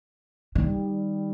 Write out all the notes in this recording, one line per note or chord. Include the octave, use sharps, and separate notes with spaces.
D#3 G3